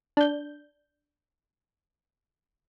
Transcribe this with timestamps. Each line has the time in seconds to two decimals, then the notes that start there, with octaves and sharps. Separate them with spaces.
0.17 D4 G6